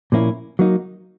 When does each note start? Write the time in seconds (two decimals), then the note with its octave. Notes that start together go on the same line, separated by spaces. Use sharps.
0.12 A#2 F3 A#3 C#4 E4
0.59 F#3 A#3 D#4